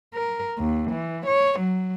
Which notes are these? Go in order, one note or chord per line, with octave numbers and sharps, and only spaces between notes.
A#4
D#2
E3
C#5
F#3